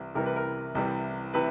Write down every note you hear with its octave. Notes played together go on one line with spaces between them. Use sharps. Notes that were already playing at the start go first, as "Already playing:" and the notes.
Already playing: C2 C3 E3 G3
C2 C3 E3 G3 A#4
B4
A#4
C2 C3 E3 G3
C3 E3 B4